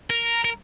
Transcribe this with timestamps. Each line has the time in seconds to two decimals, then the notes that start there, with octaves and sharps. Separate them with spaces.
0.10 A#4
0.45 A#4